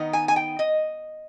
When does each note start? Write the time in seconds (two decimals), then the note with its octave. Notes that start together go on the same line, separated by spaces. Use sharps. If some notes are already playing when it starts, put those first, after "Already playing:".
Already playing: D#3 B3 D#4
0.13 G#5
0.28 G#5
0.36 G5
0.59 D#5